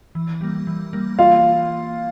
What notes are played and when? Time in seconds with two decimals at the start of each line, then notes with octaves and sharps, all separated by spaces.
0.15 E3
0.41 G3 A#3
0.67 E3
0.93 G3 A#3
1.19 E3 F4 F5